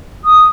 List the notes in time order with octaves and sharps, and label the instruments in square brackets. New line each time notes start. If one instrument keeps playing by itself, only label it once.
[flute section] D#6